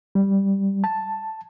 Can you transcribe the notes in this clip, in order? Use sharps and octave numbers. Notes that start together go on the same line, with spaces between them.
G3
A5